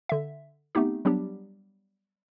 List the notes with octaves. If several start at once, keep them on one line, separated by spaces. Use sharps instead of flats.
D3 E5
A3 B3 C4 D#4 G4
F#3 G3 B3 D4 G4